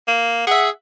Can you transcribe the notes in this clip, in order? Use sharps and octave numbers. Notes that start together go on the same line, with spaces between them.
A#3
G#4 E5 F#5